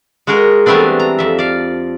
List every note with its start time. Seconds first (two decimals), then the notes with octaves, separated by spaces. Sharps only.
0.27 G#3 F#4 G#4 A#4 D#5
0.66 E3 G3 A3 B3 C4 D4
0.99 A#5
1.18 F2 E5
1.39 D5 F5